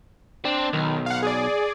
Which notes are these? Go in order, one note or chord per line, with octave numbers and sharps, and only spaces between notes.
C4 D4
B1 D#3
F5 F#5
G#4 D5